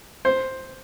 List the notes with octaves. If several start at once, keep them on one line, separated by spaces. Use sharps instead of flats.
C5